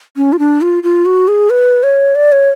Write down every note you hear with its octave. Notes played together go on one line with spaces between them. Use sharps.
C#4
F4
D4
F4
F4
F#4
G#4
B4
C#5
D5
C#5